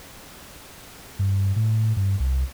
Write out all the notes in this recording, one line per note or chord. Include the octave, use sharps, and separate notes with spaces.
G2
A2
G2
C2